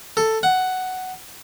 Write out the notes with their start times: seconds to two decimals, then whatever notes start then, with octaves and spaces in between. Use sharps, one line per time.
0.17 A4
0.43 F#5